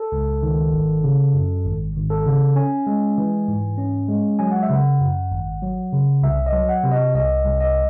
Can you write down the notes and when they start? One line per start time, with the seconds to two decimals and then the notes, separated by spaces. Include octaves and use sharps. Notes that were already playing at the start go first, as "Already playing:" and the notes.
Already playing: A4
0.12 C#2
0.43 D#3
0.72 G#1
1.04 C#3
1.34 F#2
1.65 G#1
1.96 G#1
2.10 A4
2.26 C#3
2.56 C#4 G#5
2.87 G#3
3.18 E3
3.48 G#2
3.78 C#4
4.08 G#3
4.39 F#3 G#5
4.51 F#5
4.63 E5
4.70 C#3 F#5
5.00 F#2
5.32 G#1
5.62 F#3
5.93 C#3
6.23 C2 E5
6.46 D#5
6.53 F#3
6.69 F#5
6.84 C3
6.92 D#5
7.14 C2 D#5
7.45 C2
7.60 D#5